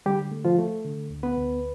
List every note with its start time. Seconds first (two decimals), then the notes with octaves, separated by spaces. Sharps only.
0.06 D3 G3 G4
0.32 A3
0.45 F3 F4
0.58 A3
0.85 D3
1.10 D2
1.23 B3 B4
1.37 D2